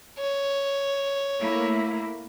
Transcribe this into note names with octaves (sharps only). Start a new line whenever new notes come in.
C#5
A3 A#3 E4